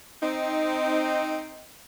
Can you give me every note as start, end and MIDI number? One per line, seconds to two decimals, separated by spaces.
0.22 1.67 60
0.22 1.67 63